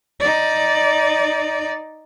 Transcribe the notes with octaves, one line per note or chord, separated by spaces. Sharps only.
D#4 D5